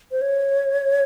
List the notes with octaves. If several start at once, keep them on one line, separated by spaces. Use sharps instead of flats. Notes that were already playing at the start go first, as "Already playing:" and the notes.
C5
C#5